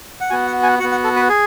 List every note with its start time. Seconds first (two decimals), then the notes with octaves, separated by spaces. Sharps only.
0.21 F#5
0.30 B3 F#4 G#5
0.47 F#5
0.63 G#5
0.79 F#4 F#5
0.84 B3
0.91 F#5
1.04 A4
1.16 B4
1.29 G#4